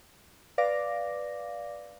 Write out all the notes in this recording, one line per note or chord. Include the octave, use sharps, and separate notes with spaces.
B4 D5 F5 D6 A#6